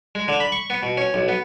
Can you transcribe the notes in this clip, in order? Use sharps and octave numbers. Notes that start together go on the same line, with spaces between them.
G#3
D3
B5
C#6
B3
B2
C#4
B1
B3